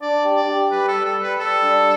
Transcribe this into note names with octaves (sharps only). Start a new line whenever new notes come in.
D4 D5
G4
D5
G4
G3 B4
A4
G3
A4
G3
B4
G3 A4
D4